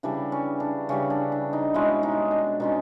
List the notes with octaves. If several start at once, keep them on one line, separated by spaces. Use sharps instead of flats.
C#3 E3 G3 D4
C#4
D4
C#3 E3 G3 C#4
D4
D4
D#4
B2 G#3 C#4 E4
D#4
D4
B2 G#3 C#4 D#4